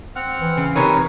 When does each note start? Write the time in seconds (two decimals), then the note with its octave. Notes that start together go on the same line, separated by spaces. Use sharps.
0.16 C4 F#5 F6
0.41 E3
0.57 C#3
0.76 C3 D#4 A#4 B4 C#5